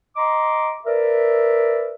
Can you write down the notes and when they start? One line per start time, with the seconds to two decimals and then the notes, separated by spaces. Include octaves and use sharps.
0.16 D#5 A#5 C6 D6
0.85 A#4 B4 D5 E5